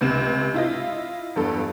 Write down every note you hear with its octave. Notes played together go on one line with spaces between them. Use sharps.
C#2 C3 E7
E4 F4 D#5
E2 G2 A4